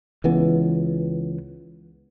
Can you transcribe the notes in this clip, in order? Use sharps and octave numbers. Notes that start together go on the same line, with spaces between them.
C#2 E3 B3